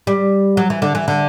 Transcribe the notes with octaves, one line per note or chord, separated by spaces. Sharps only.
G3
F#3
E3
D3
E3
D3